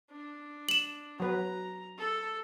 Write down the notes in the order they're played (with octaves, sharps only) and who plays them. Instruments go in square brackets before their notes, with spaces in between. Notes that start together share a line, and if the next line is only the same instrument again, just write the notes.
[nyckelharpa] D4
[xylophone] E7 F#7
[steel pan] F#3 B4 [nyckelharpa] A#5
[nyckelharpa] A4